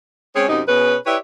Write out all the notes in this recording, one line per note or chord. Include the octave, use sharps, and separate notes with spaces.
G#3 C4 C#4 G#4 C#5
F#2 C3 F#3 D#4
B2 C#4 G#4 B4
E4 G4 B4 C#5 D5 E5